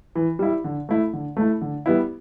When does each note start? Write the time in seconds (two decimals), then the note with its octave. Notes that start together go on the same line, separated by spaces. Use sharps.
0.15 E3
0.39 G3 E4
0.64 D3
0.89 A3 E4
1.13 D3
1.37 A3 E4
1.61 D3
1.86 G3 B3 E4